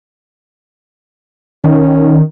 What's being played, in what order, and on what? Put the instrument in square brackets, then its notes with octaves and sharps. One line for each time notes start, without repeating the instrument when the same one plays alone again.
[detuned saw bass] D#3 [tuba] C#4